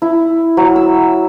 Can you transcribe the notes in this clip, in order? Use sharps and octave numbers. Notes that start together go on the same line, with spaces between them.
E4
F#3
E6